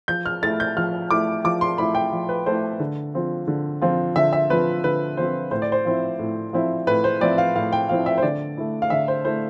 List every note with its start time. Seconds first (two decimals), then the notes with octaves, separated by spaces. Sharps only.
0.08 F3 G6
0.26 F6
0.42 A3 E4 A6
0.60 G6
0.77 F3 F6
1.11 A3 E4 D6
1.44 F3 D6
1.61 C6
1.78 A3 E4 B5
1.95 G5
2.12 F3
2.29 B4
2.46 A3 E4 C5
2.80 D3
3.14 F3 C4 F4
3.48 D3
3.82 F3 C4 F4
4.16 D3 E5
4.33 E5
4.50 F3 C4 F4 B4
4.83 D3 B4
5.17 F3 C4 F4 C5
5.51 A2 C5
5.62 D5
5.72 C5
5.85 F3 C4 E4
6.19 A2
6.53 F3 C4 E4
6.87 A2 B4
7.04 C5
7.21 F3 C4 E4 D5
7.38 F5
7.55 A2 F5
7.73 G5
7.89 F3 C4 E4 F5
8.06 E5
8.18 C5
8.22 D3 D5
8.57 A3 E4
8.82 F5
8.90 D3 E5
9.08 C5
9.24 A3 E4 C5